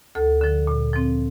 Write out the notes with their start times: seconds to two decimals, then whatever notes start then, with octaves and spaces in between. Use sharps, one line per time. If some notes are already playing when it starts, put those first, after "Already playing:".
0.15 D2 A4
0.41 D3 F3
0.67 A#2
0.93 F3 C4